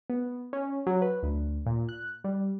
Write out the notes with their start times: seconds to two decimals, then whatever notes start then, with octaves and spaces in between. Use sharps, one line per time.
0.10 B3
0.53 C#4
0.87 F#3
1.02 B4
1.23 D2
1.66 A#2
1.89 F#6
2.24 G3